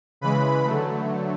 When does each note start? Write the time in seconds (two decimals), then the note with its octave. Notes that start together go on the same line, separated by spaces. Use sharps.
0.21 C#3 E3 G#3 B4 B5
0.65 D3 F#3 A3